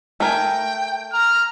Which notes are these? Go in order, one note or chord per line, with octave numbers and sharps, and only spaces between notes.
A3 A#4 G5 G#5
A#5 F6